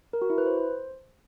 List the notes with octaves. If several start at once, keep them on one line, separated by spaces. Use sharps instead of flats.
A#4
F#4
E4
B4
C5